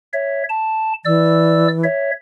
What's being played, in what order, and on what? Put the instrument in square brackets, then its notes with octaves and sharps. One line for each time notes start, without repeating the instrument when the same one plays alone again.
[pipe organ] C#5 E5
A5
[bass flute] E3 [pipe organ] D5 E6
[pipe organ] C#5 E5